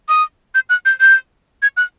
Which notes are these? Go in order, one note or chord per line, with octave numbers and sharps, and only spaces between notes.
D#6
G6
F#6
G6
G6
G#6
F#6